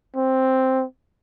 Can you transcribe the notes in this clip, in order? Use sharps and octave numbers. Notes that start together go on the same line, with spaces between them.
C4